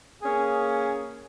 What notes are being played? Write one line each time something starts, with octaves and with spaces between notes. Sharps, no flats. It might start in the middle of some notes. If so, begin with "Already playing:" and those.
A#3 C#4 G#4